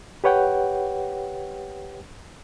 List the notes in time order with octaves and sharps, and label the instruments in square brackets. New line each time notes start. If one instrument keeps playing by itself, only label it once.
[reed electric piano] G4 B4 C#5 F#5 G5